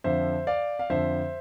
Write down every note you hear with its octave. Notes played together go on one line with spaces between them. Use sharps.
F2 D3 F3 C5 E5
D5 F5
F5
F2 D3 F3 C5 E5